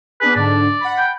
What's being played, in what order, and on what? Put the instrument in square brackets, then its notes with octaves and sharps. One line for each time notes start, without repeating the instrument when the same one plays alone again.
[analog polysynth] B3 D4 G#4 [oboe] B4
[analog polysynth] G#2 D3 D4 [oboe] D5
[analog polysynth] F#5 B5
[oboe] G5